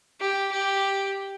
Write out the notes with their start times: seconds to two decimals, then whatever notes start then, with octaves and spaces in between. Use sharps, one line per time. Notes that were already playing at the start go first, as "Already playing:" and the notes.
0.21 G4
0.52 G4